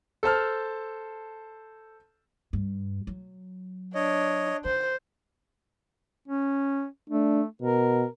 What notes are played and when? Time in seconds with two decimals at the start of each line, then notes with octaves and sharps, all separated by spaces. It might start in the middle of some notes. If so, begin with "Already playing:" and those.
0.23 A4 C5 A5 F6
2.53 G2
3.07 F#3
3.95 D4 C#5 D#5
4.65 D#3 C5
6.28 C#4
7.10 A3 D4
7.62 B2 A#4